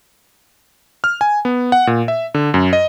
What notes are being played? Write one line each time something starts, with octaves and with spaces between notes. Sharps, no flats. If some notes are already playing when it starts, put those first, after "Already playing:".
F6
G#5
B3
F#5
A#2
E5
D3
F#2
D#5